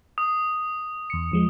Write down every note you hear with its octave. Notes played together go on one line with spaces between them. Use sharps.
D#6
E2 C#7
E2 F3 G#3